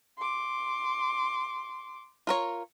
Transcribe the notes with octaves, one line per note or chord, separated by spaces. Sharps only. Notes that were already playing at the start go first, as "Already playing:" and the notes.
C6 D6
F4 A#4 C#5